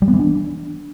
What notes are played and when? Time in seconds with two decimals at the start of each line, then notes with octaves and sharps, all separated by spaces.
0.02 G3
0.08 B3
0.13 E3
0.19 D4